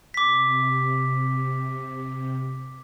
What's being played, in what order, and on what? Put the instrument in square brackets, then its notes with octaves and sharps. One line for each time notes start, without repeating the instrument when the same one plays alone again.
[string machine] C3 [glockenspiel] D6 B6